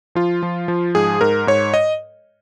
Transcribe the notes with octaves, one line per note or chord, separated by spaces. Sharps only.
F3 F4
F3
F3
G#2 G#4
G#2 A#4
G#2 C#5
D#5